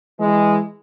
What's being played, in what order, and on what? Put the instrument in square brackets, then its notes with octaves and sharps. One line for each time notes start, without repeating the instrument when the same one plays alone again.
[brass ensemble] E3 G#3